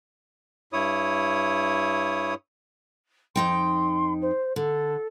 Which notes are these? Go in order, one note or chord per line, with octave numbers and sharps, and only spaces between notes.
G2 E4 C#5 D#6
F2 D#4 G5 C6
C5
D3 A4